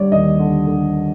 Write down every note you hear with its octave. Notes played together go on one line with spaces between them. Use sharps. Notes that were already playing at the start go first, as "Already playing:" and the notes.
Already playing: D3 G3 C#5 D5
D#2 D#5
D3
D3